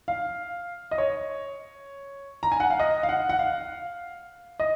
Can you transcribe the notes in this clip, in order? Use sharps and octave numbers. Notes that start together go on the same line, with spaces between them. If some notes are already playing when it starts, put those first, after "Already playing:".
F5
D#5
C#5
A#5
G#5
F#5
F5
D#5
F5
F#5
F#5
F5
D#5